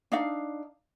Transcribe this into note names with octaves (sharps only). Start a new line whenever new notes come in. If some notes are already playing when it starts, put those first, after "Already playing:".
D4 D#4 F5